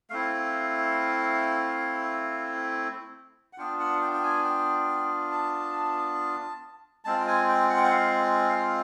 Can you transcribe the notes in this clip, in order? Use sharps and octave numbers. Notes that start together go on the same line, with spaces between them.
A3 C4 E4 F5
F#5
B3 D4 F4 G5
F#5
G5
G5
G#5
G5
A5
G#3 C4 F4 A5
G5
G#5
G5
F#5
G5
F#5
F5
F5